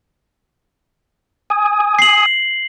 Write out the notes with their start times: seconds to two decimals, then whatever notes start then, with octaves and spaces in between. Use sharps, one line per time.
1.50 G#5 D#6
1.99 C7 F#7